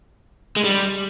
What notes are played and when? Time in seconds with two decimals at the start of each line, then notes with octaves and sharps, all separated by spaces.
0.56 G#3
0.64 G3